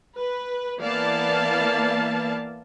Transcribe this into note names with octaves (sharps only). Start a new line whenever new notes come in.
B4
E3 A#3 B3 D5 F5 A5